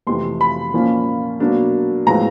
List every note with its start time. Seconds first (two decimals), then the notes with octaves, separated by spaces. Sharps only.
0.07 F2 C3 E3 A3 C6
0.41 B5
0.73 A#2 F3 A#3 C#4
1.40 B2 F#3 A#3 D4
2.06 A2 F3 G#3 B3 A#5